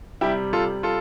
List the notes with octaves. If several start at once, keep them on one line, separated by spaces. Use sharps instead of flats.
C3 G3 E4 G4
F4 A4
F4 A4